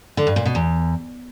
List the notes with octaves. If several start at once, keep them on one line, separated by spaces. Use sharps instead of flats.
D3
G2
A#2
B2
E2